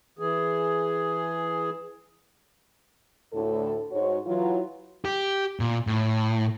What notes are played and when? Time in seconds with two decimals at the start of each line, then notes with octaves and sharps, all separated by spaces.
0.19 E3 G#4
3.33 D2 A2 A4
3.91 G#2 F#4 C#5
4.26 E3 F#3 F4
5.05 G4
5.60 A#2
5.87 A2